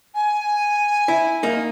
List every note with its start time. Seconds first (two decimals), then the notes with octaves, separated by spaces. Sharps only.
0.14 G#5
1.08 E4
1.43 A#3 D#4